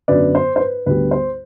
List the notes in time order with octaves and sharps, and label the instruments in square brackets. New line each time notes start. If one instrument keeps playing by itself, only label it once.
[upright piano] F#2 D3 F#3 B3 B4 D5
C5
C5
B4
D2 D3 G3 B3 B4
C5